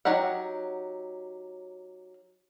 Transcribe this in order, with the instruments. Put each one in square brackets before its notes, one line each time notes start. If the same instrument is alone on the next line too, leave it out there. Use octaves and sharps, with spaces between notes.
[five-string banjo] F#3 D#4 G4 F#5